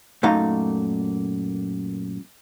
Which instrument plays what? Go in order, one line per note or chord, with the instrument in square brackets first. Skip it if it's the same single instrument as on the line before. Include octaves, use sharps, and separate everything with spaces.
[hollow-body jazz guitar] F#2 A#2 A3 D#4 F5 A#5